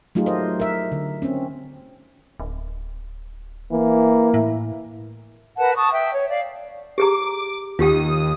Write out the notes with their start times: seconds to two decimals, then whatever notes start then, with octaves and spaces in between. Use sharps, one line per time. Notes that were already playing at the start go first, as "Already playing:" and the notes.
0.15 F#3 A3 D#4 F4 G4 G#4
0.26 A#4 C5 D#5
0.60 A#4 E5
0.92 D3
1.22 C4 C#4
2.40 D1
3.72 E3 A#3
4.34 A2 E4
5.57 A#4 B4 F#5 A5
5.75 A5 C#6 D#6
5.91 E5 G5
6.12 C#5
6.29 D5 F5
6.98 G4 G#4 A#5 D6
7.79 D#2 F4 G4 G5 D#6